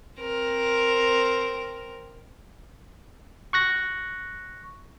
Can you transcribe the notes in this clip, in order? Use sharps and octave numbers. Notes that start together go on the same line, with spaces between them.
C4 A#4
C#6 F#6 A#6